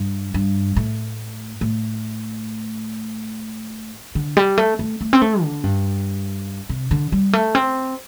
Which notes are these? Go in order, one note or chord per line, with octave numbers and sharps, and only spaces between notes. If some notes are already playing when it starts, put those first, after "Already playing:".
Already playing: G2
G2
A2
A2
D3
G3
A3
A3
A3
C4
A3
D3
G2
C3
D3
G3
A3
C4